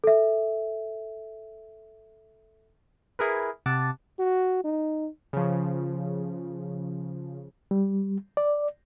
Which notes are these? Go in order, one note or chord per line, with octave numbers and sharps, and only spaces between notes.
A4 E5
E4 G#4 A#4 B4
C3 F#5 A5 D6 A6
F#4
D#4
C#3 F3
G3
D5